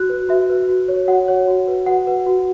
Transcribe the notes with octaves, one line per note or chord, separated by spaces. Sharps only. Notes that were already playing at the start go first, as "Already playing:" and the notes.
Already playing: F#4 F#6
B4
F#4 E5
B4
F#4
C#5
F#4 F#5
C#5
F#4
B4
F#4 F#5
B4
F#4